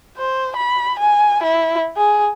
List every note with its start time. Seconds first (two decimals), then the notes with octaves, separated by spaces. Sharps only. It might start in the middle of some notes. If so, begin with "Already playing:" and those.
0.18 C5
0.57 B5
0.99 G#5
1.43 E4
1.97 G#4